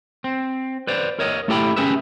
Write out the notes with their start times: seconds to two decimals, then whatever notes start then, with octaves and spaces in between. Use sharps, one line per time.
0.24 C4
0.87 B4 C5 D5
1.19 A#4 C#5 D#5
1.48 A3 E4 G4 A4 G5 B5
1.76 C#4 G4 G#4 B4 E5